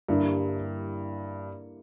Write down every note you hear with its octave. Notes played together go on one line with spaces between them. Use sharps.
G2 D3 G3 A#3 E4